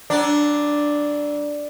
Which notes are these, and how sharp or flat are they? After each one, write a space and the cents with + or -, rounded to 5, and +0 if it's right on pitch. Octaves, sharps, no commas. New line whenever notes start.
F#3 +35 D4 +0 D5 +0